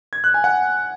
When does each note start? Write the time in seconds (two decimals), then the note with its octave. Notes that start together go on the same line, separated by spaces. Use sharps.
0.13 G#6
0.24 F#6
0.34 G#5
0.44 F#5